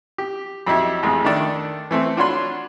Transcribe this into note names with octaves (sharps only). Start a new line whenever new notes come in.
G4
F2 F#3 D#4 E4 G4
A1 F2 G#3 G#4
D#3 A3 D4 D5
E3 A3 C4
D4 F4 F#4 C#5 B5 C6